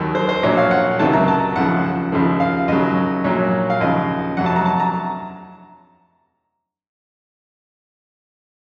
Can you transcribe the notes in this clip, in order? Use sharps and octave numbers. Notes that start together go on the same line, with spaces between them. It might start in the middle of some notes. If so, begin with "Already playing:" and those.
Already playing: D#2 D#3 F#3 A#4
C5
C5
A#1 A#2 F#3 C#5
F5
F#5
C#2 C3 D#3 F#3 A5
A#5
A5
D#2 C#3 F3 F#5
D#2 C#3 F3
F5
D#2 C#3 F#3 D#5
A#1 A#2 F#3 C#5
F5
D#2 C#3 F3 D#5
F2 C3 F#3 F#5
A5
A#5
A5
A#5